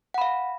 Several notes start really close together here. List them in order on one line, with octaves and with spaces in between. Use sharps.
F#5 B5 F5